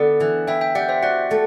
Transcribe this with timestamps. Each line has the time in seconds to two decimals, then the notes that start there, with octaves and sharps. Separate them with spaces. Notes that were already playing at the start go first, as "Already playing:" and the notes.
Already playing: D3 B3 E4 D5 F#5
0.20 E3
0.47 E4 E5 G5
0.61 E5 G5
0.75 G4 D5 F#5
0.89 C5 E5
1.03 F#4 D5 F#5
1.31 A3